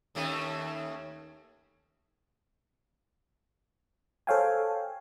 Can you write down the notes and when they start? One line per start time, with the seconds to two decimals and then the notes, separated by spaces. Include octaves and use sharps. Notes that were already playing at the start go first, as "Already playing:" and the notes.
0.15 D#2 A3 C#4
4.27 A4 C5 C#5 F5 G5 G#5